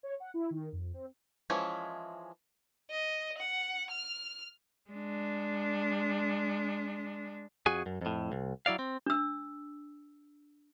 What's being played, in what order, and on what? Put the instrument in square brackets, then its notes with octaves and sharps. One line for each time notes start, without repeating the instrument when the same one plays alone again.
[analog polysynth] C#5
F#5
E4
D#3
F2
C4
[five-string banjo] E3 F3 G#3 C#4 E4
[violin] D#5
F#5
F6
[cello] G#3 D4
[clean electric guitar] F2 F#4 G#4 G#5
F#2
F2 A2
C2
F#3 E4 D5 F5
C4
[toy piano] D4 E6